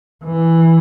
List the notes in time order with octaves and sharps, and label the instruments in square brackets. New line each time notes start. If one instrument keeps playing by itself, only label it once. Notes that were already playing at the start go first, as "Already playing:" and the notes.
[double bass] E3